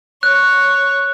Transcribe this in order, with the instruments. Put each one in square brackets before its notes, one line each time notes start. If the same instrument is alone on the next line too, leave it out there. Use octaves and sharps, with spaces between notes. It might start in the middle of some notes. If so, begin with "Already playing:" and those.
[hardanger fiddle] C#5 [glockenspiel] F#6